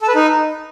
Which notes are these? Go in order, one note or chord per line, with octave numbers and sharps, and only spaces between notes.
A4
B4
D#4